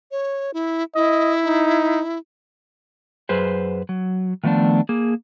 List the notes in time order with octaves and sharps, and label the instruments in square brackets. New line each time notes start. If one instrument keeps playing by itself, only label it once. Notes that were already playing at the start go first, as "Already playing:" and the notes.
[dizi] C#5
E4
[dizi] E4 [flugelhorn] D#5
[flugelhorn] D#4
[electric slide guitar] F#2 G#4 B4 C5
F#3
D#3 F3 A3 B3 D4
A#3 G#4